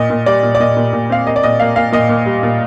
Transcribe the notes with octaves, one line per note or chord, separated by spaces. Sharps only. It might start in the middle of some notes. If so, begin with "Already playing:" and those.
Already playing: A#2 D#5
A#2
G3 D5
A#2
D5
A#2 D#5
A#2
A#2
C4 F5
A#3 D#5
D5
A#2 D#5
A#3 F5
A#2 F5
A#2 D#5
A#2
G3
A#2